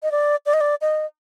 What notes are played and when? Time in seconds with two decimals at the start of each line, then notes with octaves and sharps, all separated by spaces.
0.03 D#5
0.12 D5
0.46 D5
0.54 D#5
0.61 D5
0.81 D#5